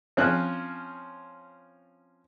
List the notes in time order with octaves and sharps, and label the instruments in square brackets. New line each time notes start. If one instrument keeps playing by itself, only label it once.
[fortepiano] F3 C4 C#4 F#6